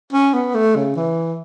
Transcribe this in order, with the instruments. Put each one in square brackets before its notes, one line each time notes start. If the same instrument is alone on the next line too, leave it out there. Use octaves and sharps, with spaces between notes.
[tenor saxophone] C#4
B3
A3
C#3
E3